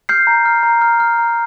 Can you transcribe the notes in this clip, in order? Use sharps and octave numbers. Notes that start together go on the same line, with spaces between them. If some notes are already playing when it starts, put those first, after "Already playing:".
F6 G6 C7
A#5
F6
A#5
F6
F6
A#5